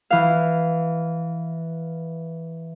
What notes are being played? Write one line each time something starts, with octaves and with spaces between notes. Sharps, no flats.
E3 F5